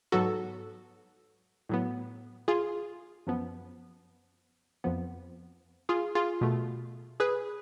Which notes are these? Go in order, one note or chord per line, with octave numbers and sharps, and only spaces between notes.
G#2 F#3 B3 F#4 A4
A2 F#3 B3
F4 G#4
F#2 F3 B3
F2 F3 B3
F4 G#4
F4 G#4
B2 A3
G#4 B4